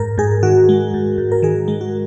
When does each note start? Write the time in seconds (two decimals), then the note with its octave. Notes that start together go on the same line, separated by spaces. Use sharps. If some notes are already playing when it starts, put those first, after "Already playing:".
Already playing: G#2 A#4
0.18 G#2 G#4
0.43 D#3 F#4
0.69 G#3
0.94 G#2
1.18 G#2
1.32 A#4
1.42 D#3 G#4
1.68 G#3
1.81 F#4